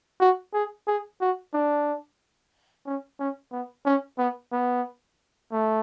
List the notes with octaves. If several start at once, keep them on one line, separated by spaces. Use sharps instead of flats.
F#4
G#4
G#4
F#4
D4
C#4
C#4
B3
C#4
B3
B3
A3